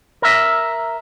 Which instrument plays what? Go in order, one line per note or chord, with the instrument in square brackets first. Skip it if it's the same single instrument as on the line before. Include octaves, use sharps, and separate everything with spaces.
[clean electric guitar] A#4 E5